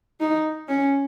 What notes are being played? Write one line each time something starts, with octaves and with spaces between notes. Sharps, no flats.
D#4
C#4